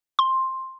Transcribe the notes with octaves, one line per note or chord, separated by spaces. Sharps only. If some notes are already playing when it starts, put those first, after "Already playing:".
C6